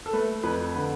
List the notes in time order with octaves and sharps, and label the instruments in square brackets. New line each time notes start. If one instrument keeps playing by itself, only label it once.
[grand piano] A4
A3 B4
F2 B4
D3 B4